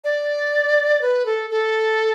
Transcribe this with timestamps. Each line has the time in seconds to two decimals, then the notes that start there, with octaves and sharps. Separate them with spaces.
0.04 D5
1.02 B4
1.26 A4
1.50 A4